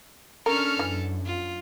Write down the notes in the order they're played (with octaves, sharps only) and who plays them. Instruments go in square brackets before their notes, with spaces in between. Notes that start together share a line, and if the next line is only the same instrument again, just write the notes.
[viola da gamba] C#4 D4 A4 [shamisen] A#4 [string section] C#6 F6
[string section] F#2 [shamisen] E3
[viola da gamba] F4